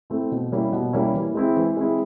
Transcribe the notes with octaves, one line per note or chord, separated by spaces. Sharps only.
A3 C4 E4
B2
G3 A#3 C#4 E4
B2
G3 A#3 C#4 E4
E3
G#3 C4 E4
E3
G#3 C4 E4